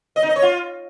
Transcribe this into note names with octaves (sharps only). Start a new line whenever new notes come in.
D#5
D#4
D#5
C#5
F4